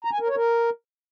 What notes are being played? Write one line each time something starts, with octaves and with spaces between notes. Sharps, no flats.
A#5
G#5
A#4
C#5
A#4